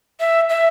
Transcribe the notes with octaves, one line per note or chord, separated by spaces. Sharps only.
E5
E5